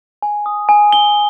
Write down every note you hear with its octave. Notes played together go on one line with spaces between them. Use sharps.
G#5
D#6
G#5
G7